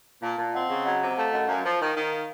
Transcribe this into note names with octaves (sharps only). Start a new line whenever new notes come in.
A#2 F5 A5
A#2 F5 A5
C4 D#5 F#5
C#3 F5
F#3 D#5 F#5
C3
A#5
A3 F5 A5
F#2 D#5 F#5
F#2 F5
F3
D#3
D#3
F5